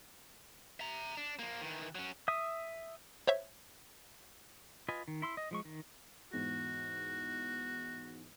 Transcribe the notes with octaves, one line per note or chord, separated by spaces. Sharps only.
E5 A#5
D4
F3 A#3
D#3 E3
F#3 C#4
E5 D#6
C5 C#5 E5
F4 B4 D#5 G#5
D#3
E4 C6 E6
D#5
F3 G#3 C#6
D#3
E2 G#2 F#4